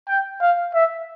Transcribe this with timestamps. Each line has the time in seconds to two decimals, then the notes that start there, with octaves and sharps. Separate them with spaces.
0.09 G5
0.41 F5
0.75 E5